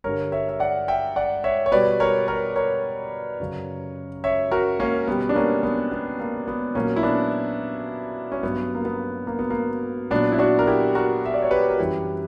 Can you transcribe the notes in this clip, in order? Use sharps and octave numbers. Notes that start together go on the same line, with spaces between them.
G2 D3 G3 A#4 C#5
C#5 E5
E5
D5 F#5
E5 G5
D5 F#5
C#5 E5
C#5
B2 G3 B4 D5
A#4 C#5
A#4 C#5
A#4 C#5
F#2 C#3 F#3
C#5 E5
F#4 A#4
A#3 C#4
B2 G3 B3
D4
A#3 C#4
B3
B3
A#3
B3
A#2 F#3 A#3 C#4
E4
B3 D4
C#4
G2 F#3 B3
A#3
B3
A#3
B3
A#3
A#2 F#3 B3 D4
E4
D4 F#4
A#4
E4 G4
F#4 A#4
E5
D5
C#5
G4 B4
A#4
F#2 E3 G3 E4 G4